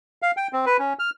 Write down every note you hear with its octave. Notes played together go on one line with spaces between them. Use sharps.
F5
G5
C4
B4
C#4
F6